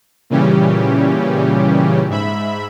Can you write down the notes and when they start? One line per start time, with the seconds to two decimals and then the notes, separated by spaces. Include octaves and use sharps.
0.30 A#2 C#3 E3 G3 C#4 G4
2.10 G#2 E5 B5